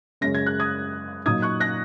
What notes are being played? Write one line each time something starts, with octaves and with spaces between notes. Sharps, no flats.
F#2 C#3 G#3 C#4 A#6
G#6
F#6
D#6 G#6
A#2 F#3 D#4 D#6 G#6
C#6 F#6
F#6 A#6